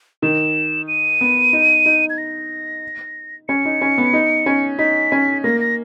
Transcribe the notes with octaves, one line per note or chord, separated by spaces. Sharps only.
D#3 E7
D#7
B3
D#4
D#4
G#6
A#6
C#4 C#7
D#4
C#4
B3
D#4
C#4
D#4 B6
C#4
A#3 A#6
A#6